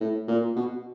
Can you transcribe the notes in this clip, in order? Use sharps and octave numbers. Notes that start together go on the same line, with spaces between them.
A2
A#2
B2